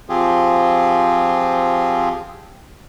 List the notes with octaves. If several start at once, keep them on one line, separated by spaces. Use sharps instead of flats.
F3 C4 F4 G4 G#4